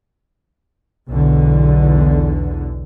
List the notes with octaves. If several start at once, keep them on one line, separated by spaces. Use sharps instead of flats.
B1 E2 D3